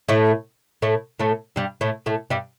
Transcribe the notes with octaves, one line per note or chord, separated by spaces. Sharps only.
A2 A3
A2 A3
A2 A3
G2 G3
A2 A3
A2 A3
G2 G3